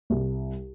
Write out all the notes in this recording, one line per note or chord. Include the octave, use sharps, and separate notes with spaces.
C2